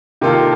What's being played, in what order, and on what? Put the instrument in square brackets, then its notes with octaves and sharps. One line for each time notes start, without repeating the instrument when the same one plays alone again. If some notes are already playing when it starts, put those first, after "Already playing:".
[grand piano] C3 D#3 A#3 F4 A4